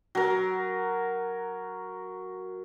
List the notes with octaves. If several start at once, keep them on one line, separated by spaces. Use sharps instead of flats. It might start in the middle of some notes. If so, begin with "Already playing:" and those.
F#3 A#4